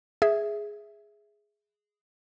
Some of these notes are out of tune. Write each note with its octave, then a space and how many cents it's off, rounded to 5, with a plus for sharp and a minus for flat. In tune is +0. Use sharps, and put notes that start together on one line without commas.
G#4 +0 E5 +0